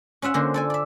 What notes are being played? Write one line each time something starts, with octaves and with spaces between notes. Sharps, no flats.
C#4 F4 E5 F#5
D3 A#3 C#4 C5
A4 D5 G#5
D5 E5